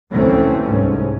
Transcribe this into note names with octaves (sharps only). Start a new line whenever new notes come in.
F1 D2 E3 A3 C4 C#4
C2 G#2 C#4